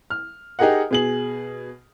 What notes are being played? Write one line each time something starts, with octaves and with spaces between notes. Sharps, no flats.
F6
D#4 G4 G#4 A#4 D#5 F#5
B2 G#4 F#7